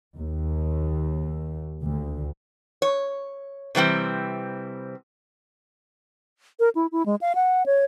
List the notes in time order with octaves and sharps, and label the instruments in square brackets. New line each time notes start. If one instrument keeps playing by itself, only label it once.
[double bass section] D#2
D2
[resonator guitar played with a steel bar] C#5
C3 E3 G3 C4
[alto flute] A#4
E4
E4
G#3
F5
F#5
C#5